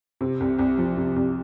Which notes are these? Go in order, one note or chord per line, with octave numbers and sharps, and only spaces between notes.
C3
C2
C2
F3
C3
C2